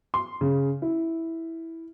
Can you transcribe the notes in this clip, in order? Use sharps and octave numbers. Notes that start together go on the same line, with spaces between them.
C6
C#3
E4